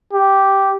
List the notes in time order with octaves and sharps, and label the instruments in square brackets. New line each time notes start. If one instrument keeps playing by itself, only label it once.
[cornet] G4